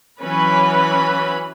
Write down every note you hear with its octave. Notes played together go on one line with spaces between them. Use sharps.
E3 F#3 C#4 B4 B5